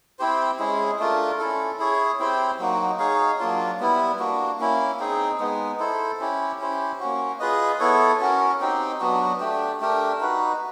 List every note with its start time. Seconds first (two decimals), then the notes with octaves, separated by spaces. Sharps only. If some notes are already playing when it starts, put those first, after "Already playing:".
0.19 C4 E4 G4 C5
0.59 G#3 C#4 E4 G#4
0.99 A3 D4 F4 A#4
1.39 C#4 E4 A4
1.79 E4 G#4 C#5
2.19 C4 E4 G4 C5
2.59 F#3 A#3 D#4 F#4
2.99 D#4 G#4 C#5 F5
3.39 F#3 A#3 D4 F4
3.80 G3 B3 E4
4.19 A#3 D4 F#4
4.60 A#3 C#4 E4
4.99 C4 D#4 G#4
5.39 G#3 B3 D#4
5.79 E4 A4 C5
6.20 C#4 E4 G4
6.59 C#4 E4 G4 C5
7.00 A#3 C#4 F#4
7.40 F4 G#4 B4 D#5
7.79 B3 E4 A4 C#5
8.20 C#4 F#4 A#4
8.61 C4 D#4 G4
9.00 F#3 B3 D4 F#4
9.40 A3 D4 G4
9.80 A3 D4 G4 A#4
10.20 D#4 F#4 B4